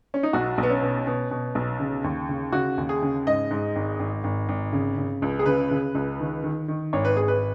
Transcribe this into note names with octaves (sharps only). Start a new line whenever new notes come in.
C#4
D#4
B1 F#4
B1
B3
C#4
B2
B2
B2
B1
C#3
D#2
C#3
C#3 F#4
D#2
G#4
C#3
G#2 D#5
G#2
G#1
G#1
G#1
G#1
C#3
C#3
C#2
G#4
C#3 B4
C#3
C#2
D#3
D#3
D#3
G#1 C#5
B4
G#1 G#4
B4